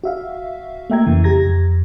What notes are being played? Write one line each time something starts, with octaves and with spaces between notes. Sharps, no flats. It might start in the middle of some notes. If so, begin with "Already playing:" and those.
F#4 E5 F5
A3 A#3 E5 G5 A#5 G#6
F2 C#3 E3
G4 A#5 G#6 A#6
F2